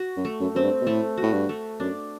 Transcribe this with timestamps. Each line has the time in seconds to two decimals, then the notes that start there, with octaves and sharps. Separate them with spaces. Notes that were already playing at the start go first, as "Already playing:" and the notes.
Already playing: F#4
0.17 F#2
0.25 A3
0.40 F#2
0.55 F#2 C4
0.63 G2
0.81 B2
0.87 A2 A3
1.18 F#4
1.23 A2
1.33 G2
1.49 A3
1.80 F#2 D4